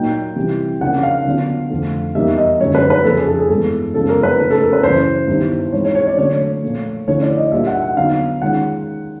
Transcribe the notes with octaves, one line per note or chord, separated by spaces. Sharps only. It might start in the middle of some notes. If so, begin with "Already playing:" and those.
Already playing: A#2 F#3 A#3 D#4 G5
C3 E3 G3 C4
C#3 F3 A#3 D4 F#5
F5
D3 F#3 B3 D4 F4
F2 D3 F3 A3
E2 B2 G3 A#3 D#4 E5
D#5
F#2 D3 F3 G#3 C#5
B4
B4
F2 C#3 F3 A#3 A4
G#4
A4
G#4
G2 E3 G#3 B3 A4
F#2 C#3 F3 G#3 B3 A4
A#4
B4
C#3 F3 A3
A4
A#4
B4
F#2 C#3 E3 C5
G2 D#3 G3 B3 E4
E3 G#3 C4 D#4 C#5
C#5
C#5
D5
D3 F#3 A3 C#5
A#2 F3 A3
D3 F3 A3 C#4 E4 C#5
D5
D#5
A#2 G3 A#3 D4 F4 E5
F#5
F#5
D3 F#3 B3 D#4 F5
D#3 G#3 C#4 F4 F#5